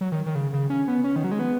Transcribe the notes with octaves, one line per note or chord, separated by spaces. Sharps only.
F#3
D#3
D#3
C#3
C#3
C#4
B3
C#4
D#3
F#3
G#3
B3